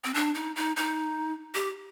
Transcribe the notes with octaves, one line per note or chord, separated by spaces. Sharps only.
C4
D4
D#4
D#4
D#4
G4